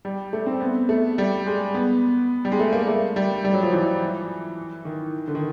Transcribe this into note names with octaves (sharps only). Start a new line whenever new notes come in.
G3
A3
C4
B3
A3
G3
G#3
B3
G3
G#3
A3
A#3
A3
G3
G3
F#3
F3
E3
D#3
D3
D#3